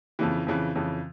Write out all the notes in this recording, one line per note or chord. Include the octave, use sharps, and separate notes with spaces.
F2 C#3 E3
F2 C#3 E3
F2 C#3 E3